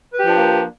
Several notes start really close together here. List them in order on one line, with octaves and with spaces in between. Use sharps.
B4 G4 F3 D4 A#3